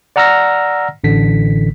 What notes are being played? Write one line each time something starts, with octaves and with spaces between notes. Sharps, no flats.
D5 F#5 A#5 E6 F6 A#6
A1 D3 B6